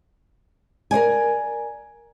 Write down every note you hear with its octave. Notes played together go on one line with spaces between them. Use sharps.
A#4 C5 D5 G#5